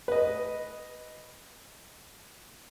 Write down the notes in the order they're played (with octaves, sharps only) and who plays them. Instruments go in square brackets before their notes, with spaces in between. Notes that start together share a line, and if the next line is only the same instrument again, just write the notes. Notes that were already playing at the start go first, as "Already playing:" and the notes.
[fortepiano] B4 D#5